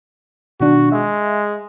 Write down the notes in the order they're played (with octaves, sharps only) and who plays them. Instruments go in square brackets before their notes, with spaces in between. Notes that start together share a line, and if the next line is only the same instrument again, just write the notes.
[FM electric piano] B2 D#3 D4 [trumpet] F#4
[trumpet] G#3 [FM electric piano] E5